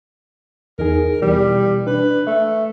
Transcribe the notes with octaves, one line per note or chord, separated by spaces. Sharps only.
E2 D#4 G#4 A#4
B2 E3 G3
D4 B4
A3 E5